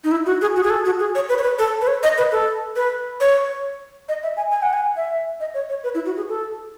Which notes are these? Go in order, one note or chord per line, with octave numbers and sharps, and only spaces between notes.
D#4
E4
F#4
G#4
F#4
G#4
A4
F#4
G#4
C#5
B4
C#5
B4
A4
B4
C#5
D#5
B4
A4
B4
C#5
D#5
E5
G#5
G#5
F#5
G#5
E5
D#5
C#5
C#5
B4
E4
F#4
G#4
A4